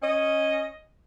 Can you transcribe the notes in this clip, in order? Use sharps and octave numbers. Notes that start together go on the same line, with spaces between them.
C#4 D#5